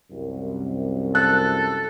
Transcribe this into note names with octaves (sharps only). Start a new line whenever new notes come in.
C2 F#2
A4 F#6